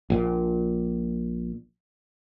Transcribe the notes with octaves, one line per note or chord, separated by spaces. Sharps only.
A#1 A#2